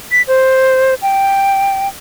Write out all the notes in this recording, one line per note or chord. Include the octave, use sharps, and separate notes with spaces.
B6
C5
G5